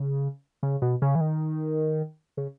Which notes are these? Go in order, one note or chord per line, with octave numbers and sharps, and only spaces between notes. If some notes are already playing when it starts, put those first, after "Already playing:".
Already playing: C#3
C#3
B2
C#3
E3
D#3
C#3